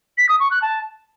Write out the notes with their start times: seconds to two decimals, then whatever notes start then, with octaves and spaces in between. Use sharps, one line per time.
0.18 B6
0.29 D#6
0.40 C#6
0.51 F#6
0.62 A5